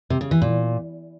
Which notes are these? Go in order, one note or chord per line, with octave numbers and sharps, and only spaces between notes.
C3
C#3
E3
A#2